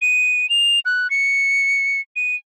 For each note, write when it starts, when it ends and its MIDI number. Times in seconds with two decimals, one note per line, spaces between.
0.02 0.49 99
0.50 0.80 101
0.85 1.10 90
1.10 2.00 97
2.16 2.36 99